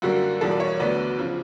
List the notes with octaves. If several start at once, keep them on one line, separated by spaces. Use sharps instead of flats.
F#2 D3 G3 A#3 F#4
E2 B2 G3 A#3 A4
D5
C#5
D2 D3 F#3 B3 D5
C#3 F3